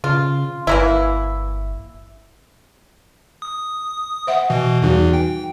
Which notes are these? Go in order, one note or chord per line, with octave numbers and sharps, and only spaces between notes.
C#3 F4
G1 E3 A#3 E4
D#6
C5 E5 F#5
B2 E3
E2 E3 G3 D#4 F#4
G5